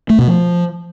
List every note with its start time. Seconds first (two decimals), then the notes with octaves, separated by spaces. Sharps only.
0.10 A3
0.19 B2
0.27 F3